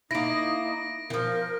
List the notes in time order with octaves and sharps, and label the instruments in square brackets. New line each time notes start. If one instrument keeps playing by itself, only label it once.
[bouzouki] A#3 E4 [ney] D#4 [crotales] A#6 D7
[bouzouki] E3 F3 [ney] A#4